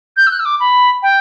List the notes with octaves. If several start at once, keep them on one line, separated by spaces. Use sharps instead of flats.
G6
E6
F#6
E6
D6
B5
G5